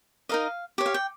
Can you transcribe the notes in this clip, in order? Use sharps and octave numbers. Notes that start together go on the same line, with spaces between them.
D#4 A#4 D#5 F5
G4 C#5
F5
G5